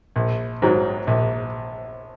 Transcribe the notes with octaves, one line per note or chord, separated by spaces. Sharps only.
A#1
G#2 D#3 F#3
A#1